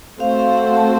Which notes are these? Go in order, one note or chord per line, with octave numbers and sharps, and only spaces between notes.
A3 C4 F#4 A4 C5 F5
F5
F5
F#5
A5